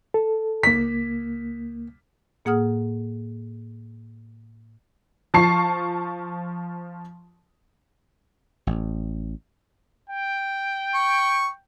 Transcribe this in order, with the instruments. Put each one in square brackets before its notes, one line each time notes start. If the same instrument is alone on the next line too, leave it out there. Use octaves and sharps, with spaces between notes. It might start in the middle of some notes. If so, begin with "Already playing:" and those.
[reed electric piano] A4
[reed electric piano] C#2 A#3 [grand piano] B6
[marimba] A2 A#3 G#4 F#5 D#6 F6
[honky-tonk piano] F3 A5 C#6 C7
[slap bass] A1
[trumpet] G5
[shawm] C#6